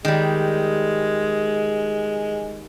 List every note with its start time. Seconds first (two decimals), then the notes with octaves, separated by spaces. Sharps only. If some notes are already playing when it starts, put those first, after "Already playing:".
0.05 D#3 G3 G#3